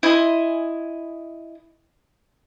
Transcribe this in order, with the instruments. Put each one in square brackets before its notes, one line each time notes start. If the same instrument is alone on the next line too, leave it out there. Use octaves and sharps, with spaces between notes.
[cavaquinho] E4 D#5 G#5 C6